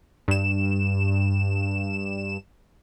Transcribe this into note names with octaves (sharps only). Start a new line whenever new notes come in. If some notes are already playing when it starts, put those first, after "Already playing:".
G2 E7